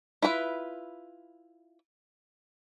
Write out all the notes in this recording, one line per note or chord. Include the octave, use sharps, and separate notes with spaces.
E4 F4 B4 E5